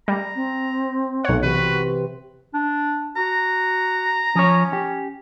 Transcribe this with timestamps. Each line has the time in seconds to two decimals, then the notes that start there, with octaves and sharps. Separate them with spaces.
0.08 G3 A#5
0.35 C4
1.25 B1 C#5 F#5
1.43 C3 E3 C4 F#4 B4
2.54 D4
3.17 F#4 A#5
4.35 F3 C#4 C#5
4.73 G4